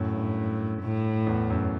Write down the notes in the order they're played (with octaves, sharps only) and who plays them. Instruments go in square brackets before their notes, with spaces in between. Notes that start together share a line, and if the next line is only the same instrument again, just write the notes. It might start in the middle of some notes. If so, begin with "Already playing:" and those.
Already playing: [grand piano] F#2 [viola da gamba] A2
[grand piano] G2
[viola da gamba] A2
[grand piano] E2
F#2